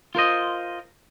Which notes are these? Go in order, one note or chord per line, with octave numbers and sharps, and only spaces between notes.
F4 A#4 C5 D#5